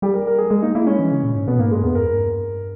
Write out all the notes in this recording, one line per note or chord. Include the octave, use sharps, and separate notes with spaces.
G3 G4
A#4
A#4
G#4
G#3 G#4
A#3 D#4
A#3 E4
G#3 C#4
E3
C#3
A#2
G#2
B2 B3
G#2 A#3
G2 G#3
E2 B3
G2 A#4